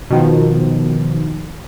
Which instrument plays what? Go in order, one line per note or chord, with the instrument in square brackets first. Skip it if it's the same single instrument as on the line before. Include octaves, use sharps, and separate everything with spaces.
[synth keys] B2 D#3 F3